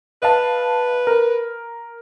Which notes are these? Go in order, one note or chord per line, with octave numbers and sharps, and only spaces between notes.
B4 D#5 F5 A5
A#4